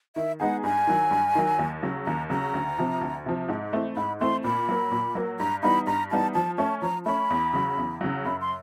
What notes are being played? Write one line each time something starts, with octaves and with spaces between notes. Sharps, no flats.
D#3 E5
G#3 B3 D#4 G#4 F#5
G2 G#5
D#3 F#3
G2
D#3 F#3
D#2
C#3 F#3
D#2 A#5
C#3 F#3 A#5
D2
C3 F3
D2
C3 F3
G#2
E3 A3 C4
G#2 B5
E3 A3 C4 C6
A#2 B5
F#3 A#3
A#2
F#3 A#3
G2 A#5
E3 G3 B3 D#4 B5
G2 A#5
E3 G3 B3 D#4 A5
F3 A5
A3 C#4 A5
F3 A#5
A3 C#4 B5
E2
C#3 F#3
E2
C#3 F#3
F#2 B5
C6